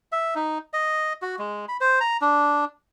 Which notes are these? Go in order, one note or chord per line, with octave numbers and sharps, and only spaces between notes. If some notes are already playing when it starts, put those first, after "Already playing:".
E5
D#4
D#5
F#4
G#3
B5
C5
A#5
D4